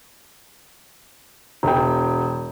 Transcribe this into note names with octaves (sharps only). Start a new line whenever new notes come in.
E1 G5